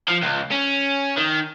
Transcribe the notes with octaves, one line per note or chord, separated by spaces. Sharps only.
F3
C#2
C#4
D#3